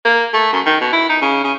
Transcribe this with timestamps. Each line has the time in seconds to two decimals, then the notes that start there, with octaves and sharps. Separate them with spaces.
0.05 A#3
0.33 A3
0.52 F#2
0.66 D#3
0.81 B2
0.92 E4
1.09 D#4
1.22 C#3
1.44 C#3